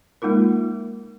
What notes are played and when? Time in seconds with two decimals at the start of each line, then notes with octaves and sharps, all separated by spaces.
0.22 G#3 A#3 D#4 F4 A#4